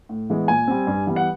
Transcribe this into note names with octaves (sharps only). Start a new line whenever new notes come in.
A2
E3 G#3 B3
A#2 G#5
G3 C4
G2
E3 G3 B3
F#5